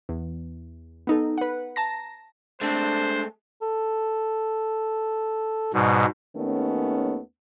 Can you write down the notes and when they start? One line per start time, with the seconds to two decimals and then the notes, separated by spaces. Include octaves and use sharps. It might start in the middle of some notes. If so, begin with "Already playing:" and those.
0.09 E2
1.07 B3 D#4 A4
1.38 B4 F#5
1.76 A5 A#5 A#6
2.61 G#3 A3 C4 D4 A4 C5
3.62 A4
5.74 G#2 B2 G3
6.36 D#2 D#3 A3 B3 C#4